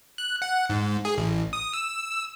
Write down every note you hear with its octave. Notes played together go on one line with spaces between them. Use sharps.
F#6
F#5
G#2
G#4
A1
D#6
E6